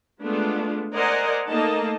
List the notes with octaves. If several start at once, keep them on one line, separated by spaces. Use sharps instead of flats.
G#3 A3 B3 D4 F4
A#4 C5 D5 D#5 F#5 G#5
A3 A#3 D#4 D#5 A5